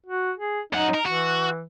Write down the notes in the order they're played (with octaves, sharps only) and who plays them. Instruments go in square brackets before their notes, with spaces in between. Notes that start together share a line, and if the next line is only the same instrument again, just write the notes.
[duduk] F#4
G#4
[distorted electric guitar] F#2 F#5 [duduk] D#4
[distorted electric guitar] A#4
[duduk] E3 [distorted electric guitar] F#4